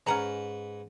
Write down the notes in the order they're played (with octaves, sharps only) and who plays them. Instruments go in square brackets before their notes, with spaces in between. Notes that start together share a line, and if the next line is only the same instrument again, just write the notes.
[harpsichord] G#2 B4 [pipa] C#4 F#5 A#5